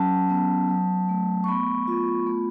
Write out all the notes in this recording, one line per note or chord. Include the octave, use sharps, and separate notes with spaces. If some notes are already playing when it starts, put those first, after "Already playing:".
Already playing: F#3 C#4 A5
B3
F#3
A3
C#6
B3 B5
F4
A3